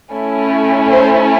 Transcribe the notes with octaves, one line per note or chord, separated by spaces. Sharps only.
A3 C#4 E4
C5